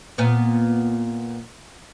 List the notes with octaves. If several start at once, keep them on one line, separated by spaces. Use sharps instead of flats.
A#2 B3